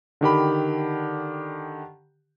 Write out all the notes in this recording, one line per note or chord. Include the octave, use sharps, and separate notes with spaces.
D3 D#3 G4 B5